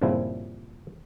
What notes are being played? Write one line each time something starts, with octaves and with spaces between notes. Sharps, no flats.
G2 A#2 C#3 F3 C4 E4